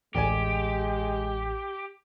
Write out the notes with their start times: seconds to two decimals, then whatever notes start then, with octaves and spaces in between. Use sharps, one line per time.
0.15 A1 D2 G#3 G4 D5 G#5